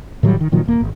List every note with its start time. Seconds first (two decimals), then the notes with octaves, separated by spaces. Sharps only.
0.23 A2 D#3 F#3 G3
0.41 D#3
0.52 A#2 D#3 F3 F#3
0.65 D#1 A#3
0.81 G#1